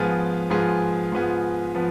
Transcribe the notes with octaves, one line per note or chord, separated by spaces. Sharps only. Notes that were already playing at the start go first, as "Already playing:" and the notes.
Already playing: G#2 F3 B3 F4 G#4
G#2 F3 B3 F4 G#4
G#2 F3 B3 F4 G#4
F3 B3